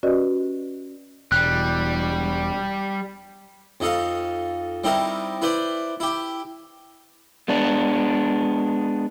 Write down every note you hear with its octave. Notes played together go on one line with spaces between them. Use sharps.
C#4 F#4 G4 B4 D5 D#5
E1 G3 F#6
F2 D#4 A4 F5
G3 C4 D#4 E4 A#4
E4 B4 C5 D5
E4 G4
G#3 B3 D4